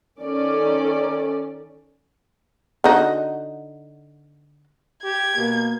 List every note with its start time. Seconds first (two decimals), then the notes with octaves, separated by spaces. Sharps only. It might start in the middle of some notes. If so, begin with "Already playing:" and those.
0.22 D#3 C#4 A4 D5
2.84 D3 D#4 F#4
5.04 G4 G#6
5.37 B2 A#3